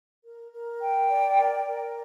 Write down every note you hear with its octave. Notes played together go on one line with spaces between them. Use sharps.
A#4
A#4
G5
D5
A#4
A#4